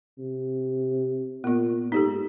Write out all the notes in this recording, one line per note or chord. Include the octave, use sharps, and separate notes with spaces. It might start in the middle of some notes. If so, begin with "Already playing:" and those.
C3
A#2 B3 F4
G#2 D#4 G4 A4